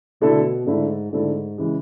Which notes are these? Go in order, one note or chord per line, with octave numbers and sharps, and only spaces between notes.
B2 D3 A3 E4 A4
G#2 D3 A3 E4 A4
G#2 D3 A3 E4 A4
C#3 E3 G#3